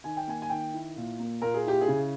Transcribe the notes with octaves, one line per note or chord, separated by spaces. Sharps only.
D#3 G#5
G5
A#3 G#5
G#5
D#3 G5
E4
A#2
A#3
A#2 A#4
G#4
E4 G4
G#4
C#3